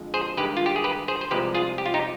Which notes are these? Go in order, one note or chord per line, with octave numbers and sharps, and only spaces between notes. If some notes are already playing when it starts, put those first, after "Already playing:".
Already playing: F2 D3 G#3
G#4 C5
G2 D#3 G#3 G4 B4
F4
G4
G#4
G4 B4
G#4 C5
C5
C2 C3 F3 G#3 G4 B4
F4 G#4
G4
F4
D#4 G4